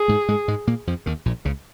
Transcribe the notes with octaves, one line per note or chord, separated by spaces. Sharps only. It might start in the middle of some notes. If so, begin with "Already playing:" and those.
Already playing: G#4
G#2 G#3
G#2 G#3
G#2 G#3
A#2 A#3
F2 F3
D#2 D#3
A#1 A#2
C#2 C#3